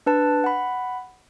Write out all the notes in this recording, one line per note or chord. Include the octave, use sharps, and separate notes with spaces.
D4 B4 A5
F#5 B5